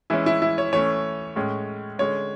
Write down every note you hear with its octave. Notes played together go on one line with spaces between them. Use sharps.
E3 G#3 C#4 E4
E4
E4
C#5
E3 A3 C#4 C#5
A2 G#3 C#4
D3 G#3 C#4 C#5